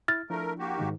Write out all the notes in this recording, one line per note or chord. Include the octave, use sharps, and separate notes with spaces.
E4 F6 A6
F3 A3 D4 E4 A#4
A#3 F#4 G4
G#2 D#3 D#4